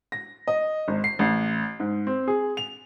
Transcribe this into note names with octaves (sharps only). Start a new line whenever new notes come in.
A#6
D#5
G#1
C7
A1
G#2
C4
G#4
F7